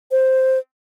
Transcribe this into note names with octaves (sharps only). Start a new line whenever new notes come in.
C5